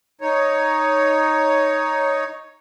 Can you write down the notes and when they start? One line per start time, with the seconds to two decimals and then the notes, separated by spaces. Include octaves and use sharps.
0.21 D#4 C#5